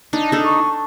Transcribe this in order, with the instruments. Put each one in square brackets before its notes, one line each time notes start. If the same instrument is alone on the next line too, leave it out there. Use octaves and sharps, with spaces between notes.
[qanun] D4 [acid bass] D#4
[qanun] D4 A4
[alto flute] C#6